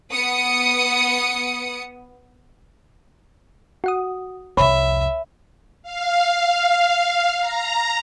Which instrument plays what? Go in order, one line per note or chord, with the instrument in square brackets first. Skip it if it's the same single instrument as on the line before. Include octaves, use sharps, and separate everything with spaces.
[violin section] B3 D#6 C#7
[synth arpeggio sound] F#4 F#5 D#6
[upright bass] C2 F2 [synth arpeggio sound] C#5 [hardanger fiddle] E5 [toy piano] G5 B5
[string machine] F5
A#5